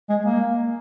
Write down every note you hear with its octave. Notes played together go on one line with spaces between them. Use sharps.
G#3
A#3